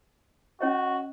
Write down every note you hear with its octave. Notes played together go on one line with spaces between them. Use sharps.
C#4 F#4 C#5 D#5